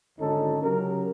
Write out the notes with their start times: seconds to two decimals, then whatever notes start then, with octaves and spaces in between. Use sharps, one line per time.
0.18 G#1 D2 D3 C#4 D#4 A4
0.61 C#3 F#3 G4 A#4